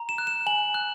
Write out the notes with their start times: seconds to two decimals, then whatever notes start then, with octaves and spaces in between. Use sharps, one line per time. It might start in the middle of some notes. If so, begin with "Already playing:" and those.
Already playing: A#5
0.09 E7
0.18 F#6
0.27 E7
0.46 G#5 F#7
0.74 F#6